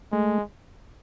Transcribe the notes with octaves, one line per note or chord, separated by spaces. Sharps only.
G#3 A3